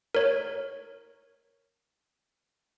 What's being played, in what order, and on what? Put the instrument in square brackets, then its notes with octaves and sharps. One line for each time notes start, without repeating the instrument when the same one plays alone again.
[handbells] A#4 C#5